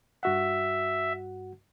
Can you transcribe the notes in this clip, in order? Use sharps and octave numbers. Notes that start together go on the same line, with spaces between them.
G2 F#4 E5 F#5